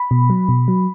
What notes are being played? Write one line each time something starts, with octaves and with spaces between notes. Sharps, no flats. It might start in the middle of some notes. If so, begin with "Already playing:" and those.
Already playing: B5
B2
F#3
B2
F#3